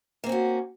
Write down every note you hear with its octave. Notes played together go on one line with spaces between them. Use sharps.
A#3 C4 C#4 F#4